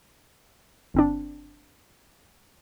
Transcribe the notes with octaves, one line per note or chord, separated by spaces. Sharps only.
G1 C4 D4